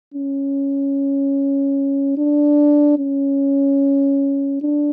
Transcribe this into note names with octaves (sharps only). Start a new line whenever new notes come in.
C#4
D4
C#4
D4